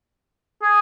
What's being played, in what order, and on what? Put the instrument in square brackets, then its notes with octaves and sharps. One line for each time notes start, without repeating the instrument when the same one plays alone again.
[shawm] G#4